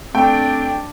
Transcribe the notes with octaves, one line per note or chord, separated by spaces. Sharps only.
A3 C4 D4 G5